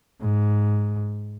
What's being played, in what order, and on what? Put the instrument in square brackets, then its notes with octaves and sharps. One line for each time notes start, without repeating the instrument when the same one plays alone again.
[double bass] G#2